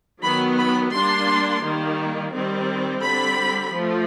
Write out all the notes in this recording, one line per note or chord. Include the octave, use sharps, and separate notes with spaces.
D#3 F#3 B3 B5
B5
G3 A#3 D4 C6
D#3 G3 A#3
D#3 G3 C4
D3 G3 C4 B5
F3 A3